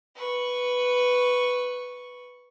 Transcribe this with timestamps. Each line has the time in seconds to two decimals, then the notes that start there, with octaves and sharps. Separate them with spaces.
0.16 B4 C#6